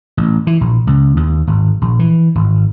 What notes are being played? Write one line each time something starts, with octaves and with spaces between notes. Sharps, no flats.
A1
E3
A#1
C#2
D#2
G#1
A#1
E3
G#1